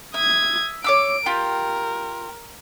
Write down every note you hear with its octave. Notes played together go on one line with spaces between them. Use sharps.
E5 D#6 G#6
C#5 D6 E6 D7
F4 G4 A#4 G5